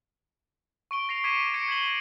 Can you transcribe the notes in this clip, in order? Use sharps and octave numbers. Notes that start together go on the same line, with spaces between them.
C#6 D7 G7
A#6 C7 F7
D6 G#6 B6 C#7 D#7 E7
G#6 A#6 C#7 D7
G#6 B6 F#7 G7